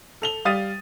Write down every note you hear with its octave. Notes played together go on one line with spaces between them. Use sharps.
A4 F7 G7
G3 F5 D#6 A6 D#7